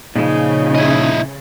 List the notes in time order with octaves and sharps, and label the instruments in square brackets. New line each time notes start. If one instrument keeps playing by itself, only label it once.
[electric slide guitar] A#2 F3 [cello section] C#3 [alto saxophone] D#4
[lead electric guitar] E4 D#5